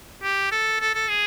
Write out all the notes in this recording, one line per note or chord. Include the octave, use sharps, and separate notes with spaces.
G4
A4
A4
A4
G#4